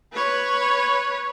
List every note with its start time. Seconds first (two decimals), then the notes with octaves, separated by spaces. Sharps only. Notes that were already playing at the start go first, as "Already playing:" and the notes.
0.13 B4 C#5